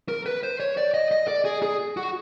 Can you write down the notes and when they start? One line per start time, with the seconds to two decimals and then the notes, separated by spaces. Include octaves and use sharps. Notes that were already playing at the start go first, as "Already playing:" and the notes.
0.08 A#4
0.26 B4
0.43 C5
0.60 C#5
0.77 D5
0.94 D#5
1.12 D#5
1.28 D5
1.45 G#4
1.63 G#4
1.97 F#4